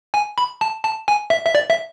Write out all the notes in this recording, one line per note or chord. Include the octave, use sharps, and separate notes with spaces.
G#5
B5
A5
A5
G#5
E5
E5
D5
E5